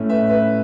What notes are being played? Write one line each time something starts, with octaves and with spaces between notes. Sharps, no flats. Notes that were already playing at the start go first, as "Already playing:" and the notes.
Already playing: A2 A3 C#4
B4 E5
B4 E5